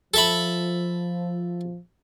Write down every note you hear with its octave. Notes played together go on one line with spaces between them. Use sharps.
F3 A4 E5 B5